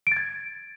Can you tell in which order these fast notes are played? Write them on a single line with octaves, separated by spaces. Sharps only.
D7 A6 G#6